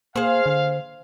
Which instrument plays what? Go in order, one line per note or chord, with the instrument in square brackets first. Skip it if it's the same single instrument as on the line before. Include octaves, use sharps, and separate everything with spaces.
[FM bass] A#3 [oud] G#4 C5 [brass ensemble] F5
[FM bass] D3